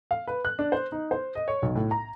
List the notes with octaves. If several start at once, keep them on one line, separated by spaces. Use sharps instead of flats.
F5
B4
F#6
D4
C5
D#4
C5
D#5
C#5
B1
A2
A#5